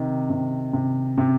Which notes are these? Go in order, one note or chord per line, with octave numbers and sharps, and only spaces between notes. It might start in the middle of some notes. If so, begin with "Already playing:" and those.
Already playing: C3 D#3
C3
C3
C3